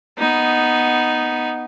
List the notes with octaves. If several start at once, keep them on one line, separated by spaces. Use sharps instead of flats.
B3 D#4